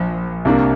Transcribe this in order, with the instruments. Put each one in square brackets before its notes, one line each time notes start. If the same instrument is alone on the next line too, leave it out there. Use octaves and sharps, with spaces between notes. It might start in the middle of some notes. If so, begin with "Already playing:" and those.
Already playing: [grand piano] A#1 [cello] F3
[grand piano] C2 C3 A#3 D4